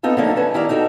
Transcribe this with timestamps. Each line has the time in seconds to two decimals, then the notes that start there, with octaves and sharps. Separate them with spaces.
0.03 B3 C4 D#4 F4 A4
0.17 D3 F3 F#3 A3 A#3 D#4
0.36 C#4 B4 A5
0.54 D#3 E4 G4 A#4 D5 F5
0.69 D#4 F#4 A4 G5